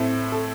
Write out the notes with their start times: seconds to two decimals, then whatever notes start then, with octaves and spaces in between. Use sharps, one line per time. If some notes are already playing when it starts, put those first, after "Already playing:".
Already playing: A2 A3 C4 A4
0.32 A4